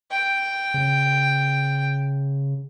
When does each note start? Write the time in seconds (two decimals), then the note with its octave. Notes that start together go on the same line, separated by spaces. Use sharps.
0.11 G5
0.74 C#3